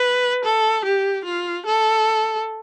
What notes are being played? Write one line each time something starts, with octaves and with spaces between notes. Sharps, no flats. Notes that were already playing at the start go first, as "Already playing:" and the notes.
Already playing: B4
A4
G4
F4
A4